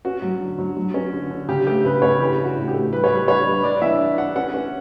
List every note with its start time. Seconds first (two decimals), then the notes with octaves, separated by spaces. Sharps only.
0.05 C#4 F#4
0.22 F#3
0.40 D3
0.59 F#3
0.77 F#3
0.94 C#4
1.13 D3
1.30 D3
1.48 C#3 G4
1.67 A3 G4
1.85 C#3 B4
2.02 C#3 C#5
2.20 E3 G4
2.38 D4
2.44 F#4
2.57 A2
2.68 G4
2.74 A3
2.93 G3 B4
3.04 C#5
3.10 G3
3.15 B4
3.28 D4 C#5
3.46 G3
3.63 D4 D5
3.82 E3 E5
3.99 D4
4.18 D4 F#5
4.36 C#4 F#5
4.54 C#4